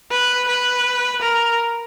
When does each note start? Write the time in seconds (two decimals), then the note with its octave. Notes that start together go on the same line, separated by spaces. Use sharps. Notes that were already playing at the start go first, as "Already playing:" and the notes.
0.11 B4
0.48 B4
1.22 A#4